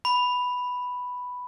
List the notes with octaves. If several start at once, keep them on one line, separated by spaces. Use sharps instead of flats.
B5